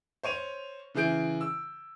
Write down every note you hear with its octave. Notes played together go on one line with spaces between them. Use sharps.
C5 C#5 D#7 F7
C#3 E3 E4 G#4 G6 D7
E6